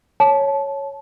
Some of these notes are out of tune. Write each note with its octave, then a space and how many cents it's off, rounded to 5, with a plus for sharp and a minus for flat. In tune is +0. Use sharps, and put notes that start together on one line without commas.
C#5 +0 A5 -20